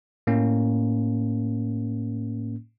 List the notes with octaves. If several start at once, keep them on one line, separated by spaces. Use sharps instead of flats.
A2 A#3 C#4